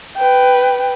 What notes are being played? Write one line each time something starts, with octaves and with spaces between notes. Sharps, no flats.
B4 G5